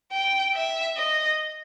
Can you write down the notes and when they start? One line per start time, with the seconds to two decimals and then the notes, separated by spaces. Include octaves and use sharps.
0.12 G5
0.54 E5
0.96 D#5